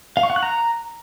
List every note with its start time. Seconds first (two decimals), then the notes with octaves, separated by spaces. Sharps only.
0.17 F5
0.23 C#6
0.30 F#5
0.36 F#6
0.43 A#5